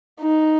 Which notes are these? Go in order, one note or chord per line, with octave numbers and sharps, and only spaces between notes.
D#4